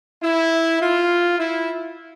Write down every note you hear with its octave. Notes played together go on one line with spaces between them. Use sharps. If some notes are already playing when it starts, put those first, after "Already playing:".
E4
F4
E4